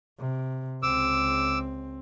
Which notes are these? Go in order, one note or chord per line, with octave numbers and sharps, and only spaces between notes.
C3
C#2 C4 D6 E6